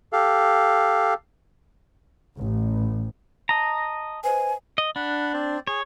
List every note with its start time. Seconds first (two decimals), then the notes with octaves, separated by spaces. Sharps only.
0.13 G4 A4 F5
2.36 A1
3.49 D#5 A5 A#5
4.24 B4 C5 D#5 G#5
4.78 D#5
4.96 D4 F#5 B5
5.34 C4 C5 D5
5.67 G#4 C#5